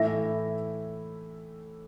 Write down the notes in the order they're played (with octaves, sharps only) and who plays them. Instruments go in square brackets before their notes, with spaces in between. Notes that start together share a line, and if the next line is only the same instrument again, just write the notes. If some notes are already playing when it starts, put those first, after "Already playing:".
Already playing: [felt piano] A2 E3 A3 E4 [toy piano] E5